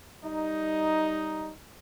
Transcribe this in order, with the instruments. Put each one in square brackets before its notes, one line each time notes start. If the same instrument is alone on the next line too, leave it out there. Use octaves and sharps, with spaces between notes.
[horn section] G3 D#4